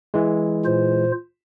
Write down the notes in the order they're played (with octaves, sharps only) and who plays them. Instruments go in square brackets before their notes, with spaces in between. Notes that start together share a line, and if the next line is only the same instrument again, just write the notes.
[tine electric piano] E3 G#3
[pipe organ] A#2 F4 C5